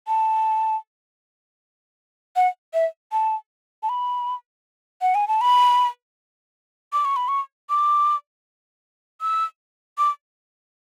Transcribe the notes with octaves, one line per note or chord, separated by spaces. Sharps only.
A5
F#5
E5
A5
A5
B5
F#5
G#5
A5
B5
D6
C#6
B5
C#6
D6
E6
D6